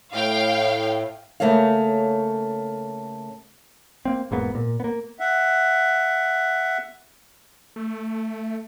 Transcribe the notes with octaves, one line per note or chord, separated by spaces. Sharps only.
A2 F5 G5
C#3 F#3 A3 A#3 C#5 F5
A#3 C4
E1 G#2 A#3 B3
A#2
A#3 B3
E5 F#5
A3